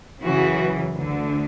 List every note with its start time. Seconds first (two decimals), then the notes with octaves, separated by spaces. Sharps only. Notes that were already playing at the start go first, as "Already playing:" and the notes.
0.24 F#2 C#3 E3 F#4
0.94 D2 D3